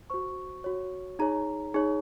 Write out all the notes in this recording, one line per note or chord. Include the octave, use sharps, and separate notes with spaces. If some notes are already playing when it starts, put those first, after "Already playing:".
F#4 C5 C#6
F#4 C#5
D#4 G#4 C#5 A#5
D#4 G#4 C#5